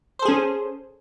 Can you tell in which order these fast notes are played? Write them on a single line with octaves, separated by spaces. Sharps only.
C5 A4 G#4 C#4